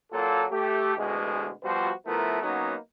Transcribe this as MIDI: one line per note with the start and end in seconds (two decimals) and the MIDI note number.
0.12 0.45 46
0.12 0.45 54
0.12 0.45 58
0.12 0.45 65
0.12 0.45 69
0.52 0.95 57
0.52 0.95 67
0.97 1.50 33
0.97 1.50 38
0.97 1.50 47
0.97 1.50 56
1.64 1.91 47
1.64 1.91 53
1.64 1.91 55
1.64 1.91 65
1.64 1.91 66
1.64 1.91 72
2.07 2.40 53
2.07 2.40 57
2.07 2.40 59
2.07 2.40 64
2.07 2.40 70
2.43 2.76 54
2.43 2.76 58
2.43 2.76 59
2.43 2.76 61
2.43 2.76 63